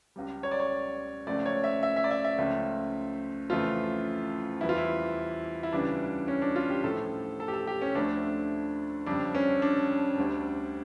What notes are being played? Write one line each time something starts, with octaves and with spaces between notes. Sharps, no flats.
C#2 C#3 G3
C#5
D5
C#5
C#2 C#3 F3 A3 D5
C#5
E5
E5
E5
D5
E5
E5
C#2 C#3 F3 A3
F2 C#3 E3 A3 F4
E2 E3 G3 E4
F4
E4
E4
D2 C#3 E3 G3 D4
C#4
D4
F4
G4
A2 F3 A3 A4
A4
G4
A4
G4
C#4
D2 D3 F3 A3 D4
F2 C#3 G3 D4
C#4
D4
D2 D3 G3